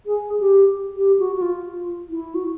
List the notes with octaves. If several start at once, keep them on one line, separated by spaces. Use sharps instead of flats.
G#4
G4
G4
F#4
F#4
F4
E4
F#4